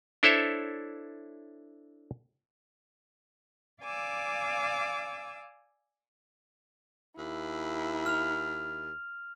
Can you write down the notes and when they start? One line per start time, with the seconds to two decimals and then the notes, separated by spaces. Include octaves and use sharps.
0.23 D4 E4 A4 C5 C#5 E5
3.83 D5 F5 G#5 D6 E6
7.18 D#2 E4
8.06 F6 F7